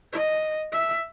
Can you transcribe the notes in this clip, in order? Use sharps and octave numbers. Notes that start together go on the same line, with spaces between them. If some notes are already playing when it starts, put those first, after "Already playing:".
D#5
E5